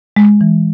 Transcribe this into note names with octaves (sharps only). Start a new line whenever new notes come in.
G#3
E3